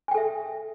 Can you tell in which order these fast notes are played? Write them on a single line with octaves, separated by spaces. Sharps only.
G#5 G5 A4 E5